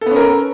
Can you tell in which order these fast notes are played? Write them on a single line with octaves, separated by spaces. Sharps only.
A4 B3 C#4 A#4